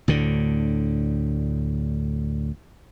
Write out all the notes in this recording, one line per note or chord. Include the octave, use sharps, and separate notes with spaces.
D2 A2 D3